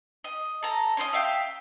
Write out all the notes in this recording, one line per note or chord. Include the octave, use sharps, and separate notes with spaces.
D#5
A4 A#5
C#4 F4 C5 D#5
E5 F5 G5